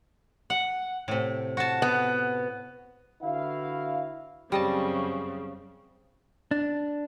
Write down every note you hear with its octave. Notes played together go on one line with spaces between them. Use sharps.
F#5
A2 C3
F#4 A5
B3
D3 E4 F#4 B4 E5 F5
F#2 C#3 G3 C4 D#5 A5
D4